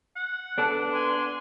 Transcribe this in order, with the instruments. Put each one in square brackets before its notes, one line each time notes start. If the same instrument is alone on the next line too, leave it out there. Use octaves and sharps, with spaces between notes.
[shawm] F#5
[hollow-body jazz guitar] B3 A4 A5 [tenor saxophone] D4
[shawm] G#5 [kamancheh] C6